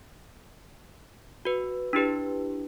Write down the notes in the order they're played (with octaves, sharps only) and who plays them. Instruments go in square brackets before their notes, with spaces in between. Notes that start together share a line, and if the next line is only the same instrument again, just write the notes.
[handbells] F#4 B4
D4 E4 G4 B4